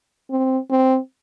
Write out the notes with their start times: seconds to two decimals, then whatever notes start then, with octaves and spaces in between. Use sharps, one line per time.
0.31 C4
0.70 C4